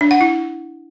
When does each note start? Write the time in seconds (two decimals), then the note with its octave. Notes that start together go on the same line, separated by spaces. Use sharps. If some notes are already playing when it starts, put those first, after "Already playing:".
0.01 D4
0.11 F#5
0.21 E4